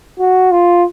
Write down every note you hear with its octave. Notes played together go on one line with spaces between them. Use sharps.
F#4
F4